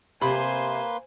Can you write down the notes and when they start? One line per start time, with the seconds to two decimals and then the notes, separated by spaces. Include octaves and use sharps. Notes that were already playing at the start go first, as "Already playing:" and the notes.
0.21 C3 A#3 B4 C5 G#5 B5 C6